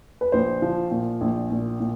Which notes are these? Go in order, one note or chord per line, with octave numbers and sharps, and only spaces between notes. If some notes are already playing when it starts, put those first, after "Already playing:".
B4
A#1 C5
F3
A#2
A#1
A#2
A#2